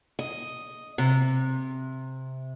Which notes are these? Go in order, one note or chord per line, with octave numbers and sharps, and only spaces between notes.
D#5
C3